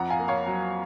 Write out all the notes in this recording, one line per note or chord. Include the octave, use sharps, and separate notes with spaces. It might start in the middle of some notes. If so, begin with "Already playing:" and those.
Already playing: F2 F#5 A#5
F5 G#5
A#3
C#5 F5
F#3